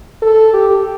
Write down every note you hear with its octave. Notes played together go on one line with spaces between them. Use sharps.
A4
G4